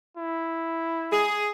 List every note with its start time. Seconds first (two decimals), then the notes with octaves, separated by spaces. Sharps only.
0.17 E4
1.12 G#4